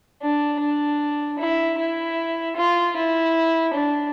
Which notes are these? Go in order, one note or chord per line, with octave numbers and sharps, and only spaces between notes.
D4
D4
E4
E4
F4
E4
D4